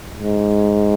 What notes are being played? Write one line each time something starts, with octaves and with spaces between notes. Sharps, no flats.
G#2